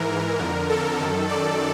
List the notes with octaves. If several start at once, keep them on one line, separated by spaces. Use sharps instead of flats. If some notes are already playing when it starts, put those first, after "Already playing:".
Already playing: G#2 E3 A#4
F2 D3
A4
F#2 D#3
D5